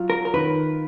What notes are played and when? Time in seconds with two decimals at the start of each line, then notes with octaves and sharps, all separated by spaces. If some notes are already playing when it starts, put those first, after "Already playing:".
Already playing: F#3 F4
0.10 A#4
0.25 A#4
0.34 D#3 B4